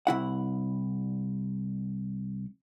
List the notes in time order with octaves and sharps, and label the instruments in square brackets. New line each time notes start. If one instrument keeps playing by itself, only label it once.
[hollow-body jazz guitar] C2 E4 F#5